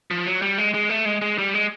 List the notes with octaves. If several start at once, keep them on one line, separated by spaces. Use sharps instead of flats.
F3
F#3
G3
G#3
G#3
A3
G#3
G#3
G3
G#3